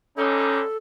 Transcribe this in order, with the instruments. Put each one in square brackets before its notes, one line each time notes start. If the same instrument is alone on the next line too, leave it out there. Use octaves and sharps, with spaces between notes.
[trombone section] D3 G3 D#4 [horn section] C#4 [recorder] A4